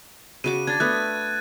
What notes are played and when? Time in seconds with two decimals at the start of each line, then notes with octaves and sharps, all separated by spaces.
0.44 C#3 F#4 D6 D#7
0.67 D4 G#6 A6
0.80 A3 B3 F#6